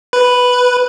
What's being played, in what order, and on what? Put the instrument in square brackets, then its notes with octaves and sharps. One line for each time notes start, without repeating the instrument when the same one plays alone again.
[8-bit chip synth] B4